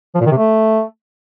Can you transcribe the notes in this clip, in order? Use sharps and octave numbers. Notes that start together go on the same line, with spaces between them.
F3
A#2
D#3
C3
A3